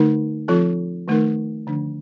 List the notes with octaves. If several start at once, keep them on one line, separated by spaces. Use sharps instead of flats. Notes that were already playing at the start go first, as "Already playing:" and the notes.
Already playing: D3 A3 D#4 A#4
F3 C4 F4 A4
D#3 A3 D#4 A#4
D3 F3 A3 D4